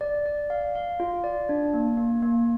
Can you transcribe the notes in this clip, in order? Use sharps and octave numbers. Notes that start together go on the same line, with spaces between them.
D5
D5
F5
F5
F4
D5
D4
A#3
A#3
A#3